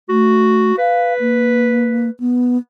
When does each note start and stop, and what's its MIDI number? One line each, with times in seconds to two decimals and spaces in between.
0.09 0.72 57
0.09 0.78 66
0.78 2.13 71
0.78 1.14 77
1.20 2.10 58
2.20 2.58 59